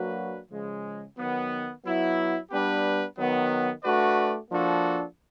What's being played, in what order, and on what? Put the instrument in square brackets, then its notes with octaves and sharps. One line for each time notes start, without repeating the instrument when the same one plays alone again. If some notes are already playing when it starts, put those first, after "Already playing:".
Already playing: [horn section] F#3 A#3 D4 F#4 B4
C#3 F3 G#3
D#3 F#3 B3
F#3 B3 E4
G3 B3 D4 G4 B4
D#3 F#3 B3
A3 D4 F#4 B4 D5
F3 A#3 D4 F#4 A4